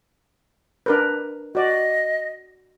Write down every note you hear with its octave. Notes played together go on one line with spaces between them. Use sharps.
D4 A#4 B4
F#4 D5 D#5